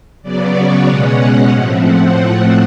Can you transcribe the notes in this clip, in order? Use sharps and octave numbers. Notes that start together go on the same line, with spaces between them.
C#3 F#3 B3 D5
C#5
B2 G#3 C#4 F#5
A2 F3 A3 C4
F#5